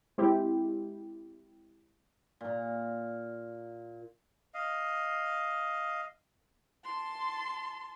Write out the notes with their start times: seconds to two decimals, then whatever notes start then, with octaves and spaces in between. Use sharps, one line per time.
0.18 G#3 C4 E4 G4
2.41 A#2 A#5
4.54 D#5 F5
6.84 A5 C6